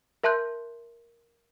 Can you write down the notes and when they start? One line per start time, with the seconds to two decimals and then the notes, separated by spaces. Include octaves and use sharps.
0.24 A#4 E5 A5 C6 F#6 G6